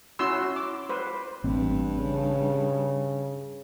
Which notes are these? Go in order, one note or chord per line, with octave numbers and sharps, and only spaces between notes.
C#4 E4 F#4 C6 E6
D6
B4 C5
A1 G2 C4
C#3